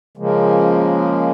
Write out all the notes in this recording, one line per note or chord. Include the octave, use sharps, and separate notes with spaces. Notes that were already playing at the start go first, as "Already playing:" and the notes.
C#3 F3 G#3 A#3